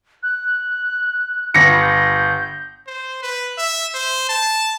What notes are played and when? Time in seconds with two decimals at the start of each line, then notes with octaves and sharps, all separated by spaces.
0.23 F#6
1.54 G1 A#6 C#7
1.82 G6
2.87 C5
3.23 B4
3.58 E5
3.94 C5
4.29 A5